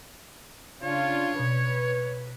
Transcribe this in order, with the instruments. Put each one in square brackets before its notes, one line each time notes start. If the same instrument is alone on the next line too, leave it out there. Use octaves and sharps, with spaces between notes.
[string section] C#3 D4 F4 [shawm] C#5
[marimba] B2 [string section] B4